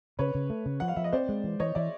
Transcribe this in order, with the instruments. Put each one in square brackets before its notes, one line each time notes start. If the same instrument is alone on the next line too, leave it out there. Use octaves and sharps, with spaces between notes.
[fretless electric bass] C#3 [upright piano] B4 C#5
[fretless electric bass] C#3
A3
C#3
[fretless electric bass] F3 [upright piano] F#5
[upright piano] F5
[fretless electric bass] F3 [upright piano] E5
[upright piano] D#5
[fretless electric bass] C4 [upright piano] C5 D5
[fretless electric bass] G#3
E3
[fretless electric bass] E3 [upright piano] C#5 D#5
[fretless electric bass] E3 [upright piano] D5 E5